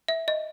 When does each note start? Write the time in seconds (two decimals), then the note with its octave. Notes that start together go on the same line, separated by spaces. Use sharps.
0.08 E5
0.28 D#5